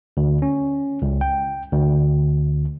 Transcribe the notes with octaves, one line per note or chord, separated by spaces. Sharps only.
D2
C#4
C#2
G5
D2